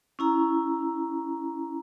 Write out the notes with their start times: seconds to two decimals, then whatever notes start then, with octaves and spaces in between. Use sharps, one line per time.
0.19 C#4 E4 A#5